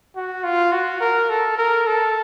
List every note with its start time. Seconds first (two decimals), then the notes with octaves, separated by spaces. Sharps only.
0.16 F#4
0.44 F4
0.72 F#4
1.01 A#4
1.30 A4
1.58 A#4
1.87 A4